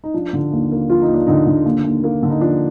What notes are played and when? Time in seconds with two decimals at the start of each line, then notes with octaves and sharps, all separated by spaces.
0.04 D#4
0.14 F3 D4
0.33 D3
0.53 D#2
0.71 A#3
0.90 F3 F4
1.02 D#4
1.08 D#2
1.14 D4
1.27 D3 D#4
1.47 D3
1.66 D#2
1.84 D#2
2.04 A#3
2.23 D3
2.30 D#4
2.41 F3 D4